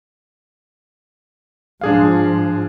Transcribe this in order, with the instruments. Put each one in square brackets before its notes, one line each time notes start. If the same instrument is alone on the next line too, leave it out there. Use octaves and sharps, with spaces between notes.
[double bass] G#2 F3 [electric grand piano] D4 G#4 F5